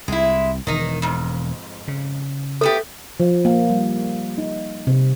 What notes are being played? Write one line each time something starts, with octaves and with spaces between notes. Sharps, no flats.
C2 G#3 E4
E1 D#3 D#4
F2 G#2
C#3
A3 B3 G4 A4
F3
A#3
G3
D#4
C3